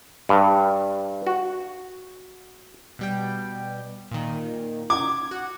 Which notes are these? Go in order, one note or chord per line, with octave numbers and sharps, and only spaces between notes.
G2
F#4
B2 G3 G5
A#2 D#3
D6 G#6
F#4 F#5